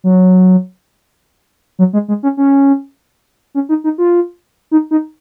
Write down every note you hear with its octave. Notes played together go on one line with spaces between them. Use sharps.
F#3
F#3
G#3
G#3
C#4
C#4
C#4
D#4
D#4
F4
D#4
D#4